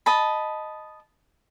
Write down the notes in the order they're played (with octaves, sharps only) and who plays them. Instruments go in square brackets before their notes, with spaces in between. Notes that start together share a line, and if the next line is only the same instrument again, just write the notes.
[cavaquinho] D#5 A5 B5